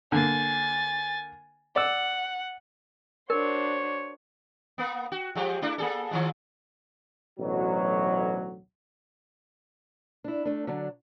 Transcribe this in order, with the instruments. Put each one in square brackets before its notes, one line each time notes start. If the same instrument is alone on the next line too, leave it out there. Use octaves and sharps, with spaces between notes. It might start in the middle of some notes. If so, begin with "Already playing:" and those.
[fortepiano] D3 A#3 [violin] G#5 A6
[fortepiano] D5 E6 [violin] F#5
[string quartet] D4 F#4 C5 [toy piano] A#4 [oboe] C#5
[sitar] A#3 B3
F#4
F3 G#3 G4
A3 D4 E4
A#3 G#4 A4
D#3 F3 G#3
[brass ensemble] A1 D2 B2 F#3
[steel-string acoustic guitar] D4 E4
A3 D4
D3 F#3 D4